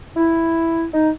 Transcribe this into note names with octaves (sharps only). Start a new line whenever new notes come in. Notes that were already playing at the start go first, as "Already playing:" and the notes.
E4
D#4